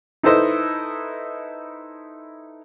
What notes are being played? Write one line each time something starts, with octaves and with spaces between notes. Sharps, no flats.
D#4 E4 A4 B4 C5 D#5